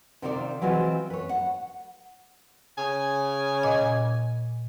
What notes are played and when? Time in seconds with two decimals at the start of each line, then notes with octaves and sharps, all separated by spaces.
0.22 C3 D#3 C4 F4 C#5 D5
0.62 E3 F#3 G#3 C4 F4
1.10 B4 C#5
1.29 F#5
2.78 C#3 G#5
3.63 A#2 D#5